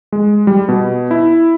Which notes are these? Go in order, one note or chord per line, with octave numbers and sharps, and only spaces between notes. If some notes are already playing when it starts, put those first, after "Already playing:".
G#3
G3
B2
E4